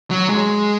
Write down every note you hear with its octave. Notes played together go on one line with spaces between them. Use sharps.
F#3
G#3